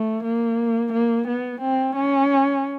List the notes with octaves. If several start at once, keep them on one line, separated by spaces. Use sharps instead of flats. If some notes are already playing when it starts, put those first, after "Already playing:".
Already playing: A3
A#3
A#3
B3
C4
C#4